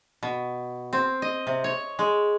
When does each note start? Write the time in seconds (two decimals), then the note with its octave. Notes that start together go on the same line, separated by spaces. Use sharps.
0.23 B2
0.93 C4
1.22 D#5
1.47 C3
1.64 C#5
1.99 G#3